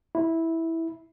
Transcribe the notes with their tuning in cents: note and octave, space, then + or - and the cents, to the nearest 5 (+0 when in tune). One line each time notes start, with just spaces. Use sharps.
E4 -10